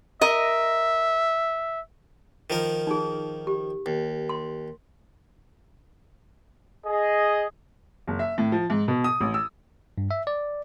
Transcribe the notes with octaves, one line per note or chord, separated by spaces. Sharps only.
A#4 D#5 E5
D#3 F3 A#4
D#4 G#4
G4
D#2
C6
G#4 D#5
F#1
E5
A2
F3
G#2
B2
D#6
A1
E6
G2
E5
D5